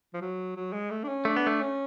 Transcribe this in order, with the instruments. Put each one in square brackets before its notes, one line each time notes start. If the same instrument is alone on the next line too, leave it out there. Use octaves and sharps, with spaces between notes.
[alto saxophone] F3
F#3
F#3
G#3
A3
D4
C#4
[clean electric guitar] A3 [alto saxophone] D4
[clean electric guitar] B3
A3
[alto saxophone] C#4